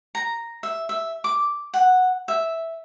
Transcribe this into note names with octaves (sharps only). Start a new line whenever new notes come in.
A#5
E5
E5
D6
F#5
E5